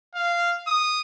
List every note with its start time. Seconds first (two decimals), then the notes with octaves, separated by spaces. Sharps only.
0.15 F5
0.67 D#6